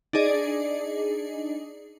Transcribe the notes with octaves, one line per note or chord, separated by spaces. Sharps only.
D4 D#4 G#4 D5 D#5